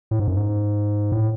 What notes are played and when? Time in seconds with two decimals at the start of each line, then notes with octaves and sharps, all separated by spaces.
0.11 A2
0.19 G#2
0.28 F#2
0.36 G#2
1.12 A2